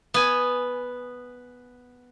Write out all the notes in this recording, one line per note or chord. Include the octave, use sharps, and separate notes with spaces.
B3 G#5